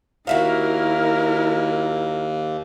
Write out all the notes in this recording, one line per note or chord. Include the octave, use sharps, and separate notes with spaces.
D#2 E4 F#4 A#4 E5 F5